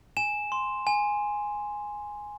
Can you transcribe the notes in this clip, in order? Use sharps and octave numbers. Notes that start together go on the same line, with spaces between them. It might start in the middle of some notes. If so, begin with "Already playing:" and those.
G#5 E7
C6
G#5